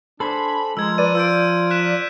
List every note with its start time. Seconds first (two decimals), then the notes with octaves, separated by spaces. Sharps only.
0.20 D4 A4 C5 G#5 B5
0.77 F3 G#3 A#4 C5 E6 G#6
0.98 B4 D5 D#7
1.15 F4 E6 G6 D7
1.71 F#6 B6 E7